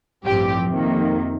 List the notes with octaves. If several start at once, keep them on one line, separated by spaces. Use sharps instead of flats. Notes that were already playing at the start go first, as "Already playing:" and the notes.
A1 G2 F3 C4 G4
F2 C3 D#3 A#3